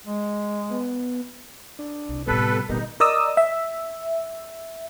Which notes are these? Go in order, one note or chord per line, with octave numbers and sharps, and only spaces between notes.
G#3
B3
D4
C2
A2 C3 G3 B3 A4 B4
A#2 D3 G3 A#3 B3 D#4
A#4 D5 D#5 D#6 E6
E5